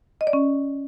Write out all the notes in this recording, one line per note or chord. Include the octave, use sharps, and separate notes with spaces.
D#5
D5
C#4